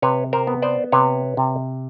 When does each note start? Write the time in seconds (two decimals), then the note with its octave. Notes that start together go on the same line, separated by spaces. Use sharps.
0.02 C3 B4 C#5
0.33 A#4 C5
0.47 B3
0.62 C5 D5
0.92 C3 B4 C#5
1.37 C3